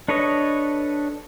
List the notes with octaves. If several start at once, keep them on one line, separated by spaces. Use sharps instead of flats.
D4 A4 B4 C#5 D#5